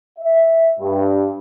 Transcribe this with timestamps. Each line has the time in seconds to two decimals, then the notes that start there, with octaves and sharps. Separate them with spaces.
0.19 E5
0.79 G2